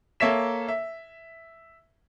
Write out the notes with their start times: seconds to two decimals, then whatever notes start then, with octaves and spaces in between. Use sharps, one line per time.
0.20 A#3 A4 C#5 E5 B6 E7
0.68 E5